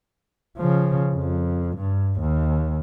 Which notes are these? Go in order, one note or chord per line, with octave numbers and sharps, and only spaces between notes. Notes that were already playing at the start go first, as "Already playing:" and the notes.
C#3 F3
F2
G2
D#2